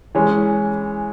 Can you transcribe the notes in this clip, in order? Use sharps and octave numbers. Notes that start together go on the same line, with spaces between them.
E3 G#3 C#4